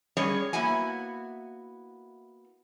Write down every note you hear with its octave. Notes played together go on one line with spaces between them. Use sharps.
G3 C#4 G#4 C#5 D#5
A#3 B3 E4 F#4 G#5